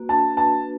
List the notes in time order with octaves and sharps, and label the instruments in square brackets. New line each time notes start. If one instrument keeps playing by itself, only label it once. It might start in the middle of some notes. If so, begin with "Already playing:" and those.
Already playing: [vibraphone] A#3 F#4 B4
[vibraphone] D4 [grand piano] A5
[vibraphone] B4 [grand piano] A5